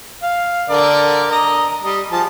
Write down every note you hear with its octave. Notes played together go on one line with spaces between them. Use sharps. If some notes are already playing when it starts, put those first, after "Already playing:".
F5
D3 A#4 D5
D#5 A#5
G3 D#5
F3 G#4 A5